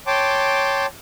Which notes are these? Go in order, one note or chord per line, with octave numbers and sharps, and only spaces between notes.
C#5 G5 A5 C6 D6